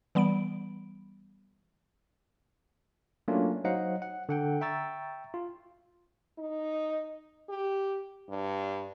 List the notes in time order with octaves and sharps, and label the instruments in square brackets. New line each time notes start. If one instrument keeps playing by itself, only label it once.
[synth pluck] E3 G3 B3 B5 D7
[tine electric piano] F#3 A3 A#3 C#4 D4 F4
F#3 D#4 C5 D#5 F5 F#5
F#5
D3 F#5 G5
E5 G5 A#5 C#6 E6 A6
F4
[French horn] D#4
G4
G2